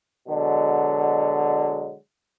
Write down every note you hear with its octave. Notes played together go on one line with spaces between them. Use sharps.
B2 D3 F#3 G#3